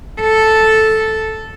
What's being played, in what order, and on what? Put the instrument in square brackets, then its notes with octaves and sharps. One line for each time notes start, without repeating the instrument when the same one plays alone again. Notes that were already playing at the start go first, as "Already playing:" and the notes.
[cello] A4